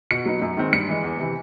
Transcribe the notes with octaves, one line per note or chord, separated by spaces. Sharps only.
B2 C#7
F#3 B3 D#4
F#2
D#3 G#3 C4 D#4
G2 C#7
E3 G#3
E2
C3 E3